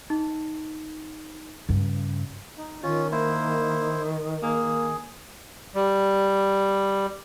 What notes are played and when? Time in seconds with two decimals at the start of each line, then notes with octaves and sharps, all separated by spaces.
0.10 D#4
1.69 G2 C#3
2.58 D#4
2.83 D#3 C#4 F4
3.12 A#3 E4 C5
4.42 A#3 G#4
5.75 G3